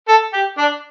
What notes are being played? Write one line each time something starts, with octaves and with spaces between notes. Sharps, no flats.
A4
G4
D4